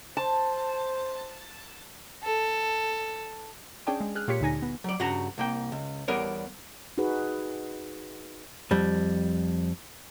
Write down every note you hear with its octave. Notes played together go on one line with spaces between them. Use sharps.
C5 A5
A4
C#4 D4 G#4 D5 G5 A5
G#3
G#4 F6 F#6
A#2 F4 G4 C#5 B6 C#7
D2 D3 D#4 G#5 A#6
B3
F#3 D5
G2 C#3 F#4 F#5 A#5
C2 A#3 G5
C#2
E2 G3 B3 A#4 C#5 D5
D#4 F#4 G#4 B4
F2 G3